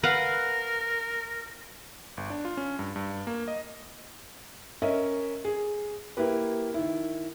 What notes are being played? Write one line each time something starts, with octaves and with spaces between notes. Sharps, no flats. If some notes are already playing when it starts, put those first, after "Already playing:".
A#4 B4 F5 F#5
G1
D4
F4
C#4
G2
G2
A#3
D#5
C#4 A#4 D#5 E5
G#4
A#3 E4 G4 B4
D#3 E4